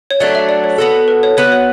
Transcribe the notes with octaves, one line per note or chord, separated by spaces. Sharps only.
C#5
F#3 A3 D4 D5
E5
D5
C#5
B3 F#4 A4
B4
C#5
B3 F#4 B4 C#5
C#5